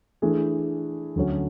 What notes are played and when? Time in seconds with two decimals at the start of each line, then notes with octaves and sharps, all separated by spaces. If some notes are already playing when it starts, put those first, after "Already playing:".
0.22 E3 A3 D4 G#4
1.16 D2 D3 F#3 C#4